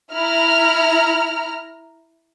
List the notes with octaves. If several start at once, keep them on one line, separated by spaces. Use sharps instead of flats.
E4 A#5 F6